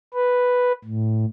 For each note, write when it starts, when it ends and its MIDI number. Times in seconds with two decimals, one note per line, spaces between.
0.14 0.72 71
0.85 1.25 45